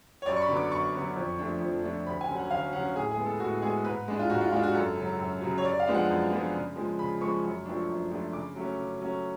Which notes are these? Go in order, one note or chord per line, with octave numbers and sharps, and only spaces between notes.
C#5
F#2 D5
C#6
B5
D3 F#3 B3
D6
F#2 C#6
D3 F#3 B3
F2
F3 A3 D4
F2
F3 A3 D4
D2 B5
G#5
D3 F#3 C#4
F#5
D2 F5
D3 F#3 C#4 F#5
A2 G#4
G#4
G#3 B3
A4
A2 F#4
G#3 B3 G#4
G#2 B4
G#3 D4
F4
G#2 F#4
F4
G#3 D4 F4
F#4
F#2 A4
C#3 F#3
F#2
C#3 F#3
C#5
F#2 D5
F5
F3 G#3 B3 D4
F#5
F#2
F3 G#3 B3 D4
C#3
F3 G#3
C#3 B5
F3 G#3 C#6
F#2
F3 A3 D4
F#2
F3 A3 D4
C#3 D6
F#3 A3 C#4
C#3
F#3 A3 C#4